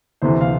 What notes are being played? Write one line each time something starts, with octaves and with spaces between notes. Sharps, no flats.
D2 C3 E3 C5
F5